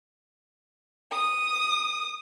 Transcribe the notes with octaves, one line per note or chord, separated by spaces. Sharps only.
D#6